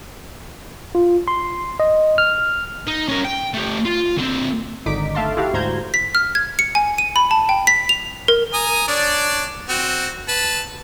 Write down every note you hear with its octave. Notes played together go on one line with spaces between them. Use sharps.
F4
C6
D#5
F6
D#4
C#4 A#4
G5
A3 G4
F4
D3 C4
G#1 D3 D#4 D6 B6 D7
A3 E5 F5 A5 C6
E4 F#4 G4 F5
D2 G#2 C5 A#5 G6 G#6
B6
F6
G#6
C#7
G#5
D#7
B5
A5
G5
B6
F7
A#4
G#5 A#5 D#6
D4 C#5 D5
C4 F#4
B4 A5